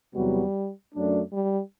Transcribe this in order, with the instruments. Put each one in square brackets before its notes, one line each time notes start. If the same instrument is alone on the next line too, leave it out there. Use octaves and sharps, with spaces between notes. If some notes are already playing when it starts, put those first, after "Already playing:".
[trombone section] E2 C3 F#3 B3 F#4 [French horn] G3
[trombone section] F#2 F#3 A3 D4
[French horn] G3